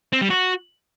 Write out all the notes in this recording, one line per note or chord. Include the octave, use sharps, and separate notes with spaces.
C4
G3
F#4